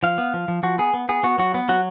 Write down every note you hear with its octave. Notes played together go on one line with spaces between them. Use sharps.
F3 F5
B3
F3
F3
F3 F#4
B3 G#4
B3
B3 G#4
B3 F#4
F#3 F#4
B3
F#3 F#4